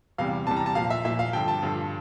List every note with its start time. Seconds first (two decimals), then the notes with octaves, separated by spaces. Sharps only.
0.18 E2 C3 E3 G3 F5
0.47 E2 C3 E3 G3 A5
0.57 A#5
0.66 A5
0.75 A#2 F3 F5
0.90 E5
1.05 A#2 F3 E5
1.19 F5
1.33 G2 D3 F3 G5
1.48 A5
1.62 G2 D3 F3